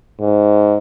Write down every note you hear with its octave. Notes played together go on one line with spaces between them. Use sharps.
G#2